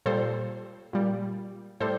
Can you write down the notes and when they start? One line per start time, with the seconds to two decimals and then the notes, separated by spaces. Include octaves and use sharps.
0.06 A#2 G3 A4 C5
0.93 A#2 G3
1.80 A2 G3 A4 C5